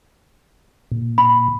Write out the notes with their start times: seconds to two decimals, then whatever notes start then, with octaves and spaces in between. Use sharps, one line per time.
0.91 A#2
1.18 B5